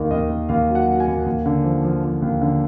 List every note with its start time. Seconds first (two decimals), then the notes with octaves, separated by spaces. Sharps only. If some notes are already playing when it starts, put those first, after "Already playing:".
Already playing: D#2 D#3 F5
0.11 D#2 D#5
0.29 D#2
0.49 D#2 F5
0.69 F#3
0.75 F#5
0.88 F#3
1.00 G#5
1.07 D#2
1.26 D#2
1.46 D3
1.64 F3
1.84 F3
2.04 F3
2.22 D#2
2.42 D3